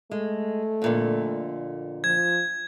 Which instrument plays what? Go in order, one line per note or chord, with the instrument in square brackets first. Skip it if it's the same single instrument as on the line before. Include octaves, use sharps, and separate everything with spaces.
[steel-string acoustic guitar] G#3 [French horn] A3
[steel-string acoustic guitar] F2 A#2 D3
[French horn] F3 [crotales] G#6